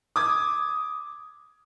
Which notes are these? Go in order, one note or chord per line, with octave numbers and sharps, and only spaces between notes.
D6 D#6 G#6